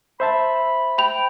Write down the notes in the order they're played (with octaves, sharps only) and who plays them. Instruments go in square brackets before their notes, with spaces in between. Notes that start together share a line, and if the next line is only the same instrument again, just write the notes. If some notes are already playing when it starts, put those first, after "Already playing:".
[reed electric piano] C5 E5 A5 [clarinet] B5
[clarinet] G5 [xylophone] B5 F7